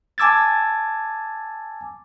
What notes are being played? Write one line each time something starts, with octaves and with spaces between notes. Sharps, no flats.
G#5 A5 D6 E6 G#6 A6